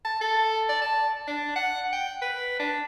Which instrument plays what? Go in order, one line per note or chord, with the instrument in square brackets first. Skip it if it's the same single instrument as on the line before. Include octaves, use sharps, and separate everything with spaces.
[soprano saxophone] A5
A4
D5
A5
D4
F#5
G5
B4
D4